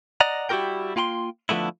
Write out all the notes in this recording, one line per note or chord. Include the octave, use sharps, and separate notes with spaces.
D5 D#5 F#5 A#5
G3 E4 F#4 G4 A#4 G5
A#3 F4 G5 B5 C6
D3 F3 A3 B3 E4